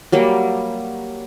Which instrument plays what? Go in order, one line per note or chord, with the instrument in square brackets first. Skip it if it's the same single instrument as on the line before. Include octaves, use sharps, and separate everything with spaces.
[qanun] F#3 G3 A#3